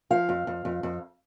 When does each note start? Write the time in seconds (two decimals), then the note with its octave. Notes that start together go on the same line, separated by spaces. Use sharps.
0.10 F3 F5
0.29 F2
0.47 F2
0.65 F2
0.83 F2